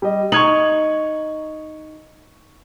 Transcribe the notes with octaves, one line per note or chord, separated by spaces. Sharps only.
G3 D#5
D#4 C#6 G#6 F#7